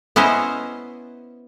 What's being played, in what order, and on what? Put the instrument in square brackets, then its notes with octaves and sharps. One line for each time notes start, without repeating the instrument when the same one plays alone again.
[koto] B3 C#4 E4 C5 D#5